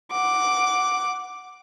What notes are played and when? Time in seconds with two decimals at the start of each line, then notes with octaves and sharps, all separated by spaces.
0.12 F#5 D6